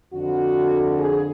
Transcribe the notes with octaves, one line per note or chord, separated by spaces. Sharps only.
F2 D3 F#4
G#4